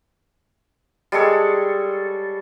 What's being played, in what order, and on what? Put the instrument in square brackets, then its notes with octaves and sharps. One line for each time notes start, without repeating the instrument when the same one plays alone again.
[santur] G3 G#3 A4 C#5